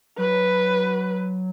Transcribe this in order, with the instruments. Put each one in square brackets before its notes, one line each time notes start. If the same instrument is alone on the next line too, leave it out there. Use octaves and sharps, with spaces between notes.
[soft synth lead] F#3 [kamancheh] B4